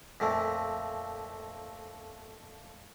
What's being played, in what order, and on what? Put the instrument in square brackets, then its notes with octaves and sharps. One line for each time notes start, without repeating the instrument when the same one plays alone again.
[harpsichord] F2 A#2 A3